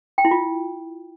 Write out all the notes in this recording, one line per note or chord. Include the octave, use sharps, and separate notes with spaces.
G5
E4
F4